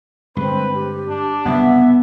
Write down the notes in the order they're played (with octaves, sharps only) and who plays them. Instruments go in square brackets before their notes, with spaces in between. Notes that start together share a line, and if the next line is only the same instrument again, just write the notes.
[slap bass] G2 D3 G#3 [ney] C4 [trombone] B4
[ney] G4
[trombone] D4
[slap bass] F#1 C2 B2 [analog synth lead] B3 [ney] E5